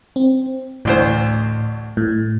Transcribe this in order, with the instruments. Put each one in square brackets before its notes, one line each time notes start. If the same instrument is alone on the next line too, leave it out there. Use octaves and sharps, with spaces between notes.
[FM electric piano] C4
[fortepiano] A1 D2 C5 [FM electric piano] A2
[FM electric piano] A2